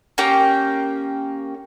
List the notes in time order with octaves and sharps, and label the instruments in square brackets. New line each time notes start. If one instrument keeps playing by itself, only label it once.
[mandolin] A#3 C#4 G4 G5